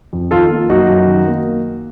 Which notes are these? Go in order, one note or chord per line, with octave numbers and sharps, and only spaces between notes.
F2
D#3 F4 A4
A#3
F#2 D#4 F#4
F#2
D#3
A#3